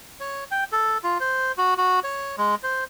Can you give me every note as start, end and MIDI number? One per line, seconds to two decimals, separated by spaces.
0.20 0.44 73
0.51 0.64 79
0.72 0.98 69
1.04 1.18 65
1.20 1.52 72
1.58 1.74 66
1.78 2.00 66
2.04 2.36 73
2.38 2.55 56
2.64 2.84 72